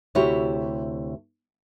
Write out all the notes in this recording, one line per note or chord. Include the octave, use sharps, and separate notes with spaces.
D2 C3 E4 F#4 G4 C#5